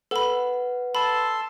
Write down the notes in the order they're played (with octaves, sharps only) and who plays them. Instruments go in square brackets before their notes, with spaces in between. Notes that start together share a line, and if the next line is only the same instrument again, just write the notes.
[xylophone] A4 B5 [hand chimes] B4 F#5
[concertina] A4 A5 C6 [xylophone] B5